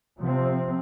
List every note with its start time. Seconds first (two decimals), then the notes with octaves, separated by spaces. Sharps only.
0.20 C3 F3 C4